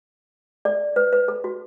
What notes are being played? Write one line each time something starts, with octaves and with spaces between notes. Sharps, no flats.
A4 D5
B4
B4
A4
F#4